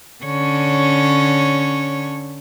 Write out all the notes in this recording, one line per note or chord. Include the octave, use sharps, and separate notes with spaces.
D3 C#4 C#5